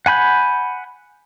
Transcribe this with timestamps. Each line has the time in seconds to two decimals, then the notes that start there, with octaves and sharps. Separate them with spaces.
0.06 F#5 G#5 B5 G6